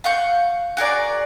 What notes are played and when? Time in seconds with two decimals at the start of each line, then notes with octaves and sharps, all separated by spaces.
0.04 F5 F#5 C#6 G6
0.77 F#4 G#4 A#4 D5